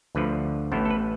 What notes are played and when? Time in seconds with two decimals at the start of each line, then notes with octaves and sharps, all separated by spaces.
0.15 D2 D3 F3 B4
0.72 A1 A2 E3 B3 C5
0.85 A4
0.91 B4